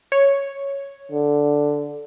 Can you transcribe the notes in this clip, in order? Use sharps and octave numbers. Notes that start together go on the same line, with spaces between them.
C#5
D3